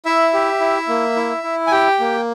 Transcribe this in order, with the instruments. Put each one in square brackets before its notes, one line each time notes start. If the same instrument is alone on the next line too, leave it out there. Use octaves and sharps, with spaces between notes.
[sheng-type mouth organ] E4 E5
G4
E4
A#3
E4
E4
G#5
G4 G5
A#3